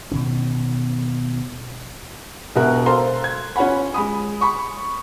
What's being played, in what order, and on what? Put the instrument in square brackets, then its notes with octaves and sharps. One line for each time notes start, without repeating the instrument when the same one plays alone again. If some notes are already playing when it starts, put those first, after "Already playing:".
[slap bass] B2 D#3 C#4
[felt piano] E1 B2 F#4 A#4 E5 F#6
A4 C5 F5 A#5 C6
G#6
C#4 F4 C#5 F#5 B5
G#3 B5 D#6
B5 C#6